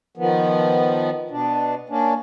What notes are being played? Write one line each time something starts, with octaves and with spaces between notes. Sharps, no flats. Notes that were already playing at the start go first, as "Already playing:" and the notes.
D#3 F3 B3
B2 D4
A#3 C#4 D4